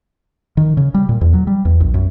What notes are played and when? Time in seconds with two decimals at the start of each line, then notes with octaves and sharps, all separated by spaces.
0.57 D#3
0.77 C#3
0.94 G3
1.09 A#2
1.21 E2
1.33 F#3
1.47 G3
1.65 E2
1.80 A#1
1.94 F#2